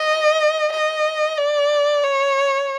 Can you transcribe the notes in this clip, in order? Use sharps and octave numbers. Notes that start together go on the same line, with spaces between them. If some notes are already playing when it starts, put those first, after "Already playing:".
Already playing: D#5
D#5
D5
C#5